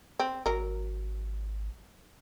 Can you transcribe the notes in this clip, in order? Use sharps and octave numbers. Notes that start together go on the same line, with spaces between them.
C4
G#1 F#3 A#4